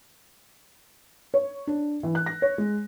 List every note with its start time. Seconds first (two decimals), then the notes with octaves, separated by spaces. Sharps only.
1.34 C#5
1.67 D4
2.03 E3
2.15 F#6
2.26 A#6
2.42 C#5
2.58 G#3